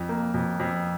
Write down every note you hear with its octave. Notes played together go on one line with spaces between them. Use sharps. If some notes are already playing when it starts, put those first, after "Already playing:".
Already playing: F2
A#3
F2
F2